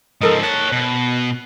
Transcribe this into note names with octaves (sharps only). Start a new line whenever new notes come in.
G#2 F3 A4 A#4 D#5
C#5 A5 F#6
B2